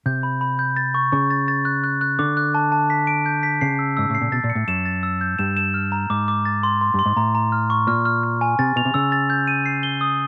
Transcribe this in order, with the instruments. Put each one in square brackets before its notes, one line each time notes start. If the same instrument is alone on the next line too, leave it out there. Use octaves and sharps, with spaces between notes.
[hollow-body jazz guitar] C3 [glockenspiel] G6
[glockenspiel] B5
B5
G6
A6
C#6
[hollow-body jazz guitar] C#3 [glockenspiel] C#6
[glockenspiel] A6
A6
F#6
F#6
F#6
[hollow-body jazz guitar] D3 [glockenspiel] D6
[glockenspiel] F#6
A5
A5
B6
D7
G6
B6
[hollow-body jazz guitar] C#3 [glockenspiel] C7
[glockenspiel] E6
[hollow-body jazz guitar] G#2 [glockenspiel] E6
[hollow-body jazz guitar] A2 [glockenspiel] C7
[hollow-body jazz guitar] A#2
[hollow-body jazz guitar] B2 [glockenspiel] A6
[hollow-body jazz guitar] A#2
[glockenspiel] C#7
[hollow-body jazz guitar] A2
[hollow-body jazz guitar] F#2 [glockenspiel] E7
[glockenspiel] A6
E6
G6
[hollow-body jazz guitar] G2 [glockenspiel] E7
[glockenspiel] E7
F6
A#5
[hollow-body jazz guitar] G#2 [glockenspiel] D6
[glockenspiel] D6
A6
C6
C6
[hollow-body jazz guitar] G2 [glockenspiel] C6
[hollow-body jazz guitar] G#2
[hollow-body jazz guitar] A2 [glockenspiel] A#5
[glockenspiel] A#5
F6
C#6
[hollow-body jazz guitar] A#2 [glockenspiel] F6
[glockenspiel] F6
F6
G#5
[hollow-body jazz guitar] C3 [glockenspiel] A6
[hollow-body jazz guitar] B2 [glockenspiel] F7
[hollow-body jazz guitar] C3
[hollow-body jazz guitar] C#3 [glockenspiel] E6
[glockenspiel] A6
G6
D#7
C7
G7
D#6